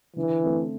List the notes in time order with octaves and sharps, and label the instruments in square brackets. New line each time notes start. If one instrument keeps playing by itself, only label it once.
[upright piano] D3 [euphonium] E3
[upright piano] A3 C4